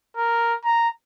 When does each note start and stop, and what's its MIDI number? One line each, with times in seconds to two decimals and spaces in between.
0.17 0.55 70
0.65 0.88 82